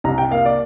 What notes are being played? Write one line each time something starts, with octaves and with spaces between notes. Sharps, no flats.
C2 A#5
G5
A#3 F5
D5